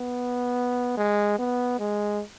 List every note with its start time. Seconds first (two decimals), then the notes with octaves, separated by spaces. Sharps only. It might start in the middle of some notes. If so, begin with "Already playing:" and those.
Already playing: B3
0.97 G#3
1.39 B3
1.79 G#3